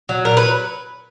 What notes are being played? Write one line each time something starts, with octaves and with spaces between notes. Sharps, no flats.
F#3
A#2 A#4
F#3 B4